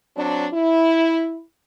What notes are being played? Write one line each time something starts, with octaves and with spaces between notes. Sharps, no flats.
F#3 C4 D4
E4